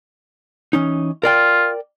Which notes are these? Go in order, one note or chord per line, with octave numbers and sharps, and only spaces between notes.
E3 C#4 D#4
F4 A#4 D5 G5